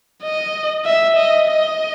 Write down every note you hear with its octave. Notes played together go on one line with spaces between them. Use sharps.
D#5
E5
D#5
D#5